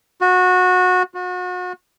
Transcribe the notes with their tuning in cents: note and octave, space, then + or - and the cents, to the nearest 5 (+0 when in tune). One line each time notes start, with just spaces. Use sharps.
F#4 -20
F#4 -35